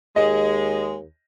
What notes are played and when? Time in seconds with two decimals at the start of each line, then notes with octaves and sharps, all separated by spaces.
0.16 D#2 G#3 D#5